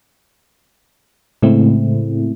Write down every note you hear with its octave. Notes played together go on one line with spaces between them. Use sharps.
A2 C#3 G#3 A3 C4 E4